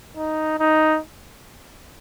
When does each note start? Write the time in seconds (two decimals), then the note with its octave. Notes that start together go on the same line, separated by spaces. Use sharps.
0.17 D#4
0.59 D#4